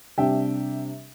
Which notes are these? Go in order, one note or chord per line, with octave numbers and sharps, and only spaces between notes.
C3 G3 D4 E5 G5